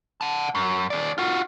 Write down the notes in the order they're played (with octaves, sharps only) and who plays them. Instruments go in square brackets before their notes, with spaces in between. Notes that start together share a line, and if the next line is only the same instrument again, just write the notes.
[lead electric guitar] F#5 A5
F#2
D#2 D5
F4 F#4